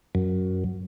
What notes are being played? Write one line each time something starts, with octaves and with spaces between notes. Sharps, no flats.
F#2